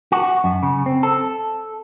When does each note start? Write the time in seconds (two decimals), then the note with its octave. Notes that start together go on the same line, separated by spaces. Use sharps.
0.12 F#4
0.44 F#2
0.63 C#3
0.86 C4
1.03 A4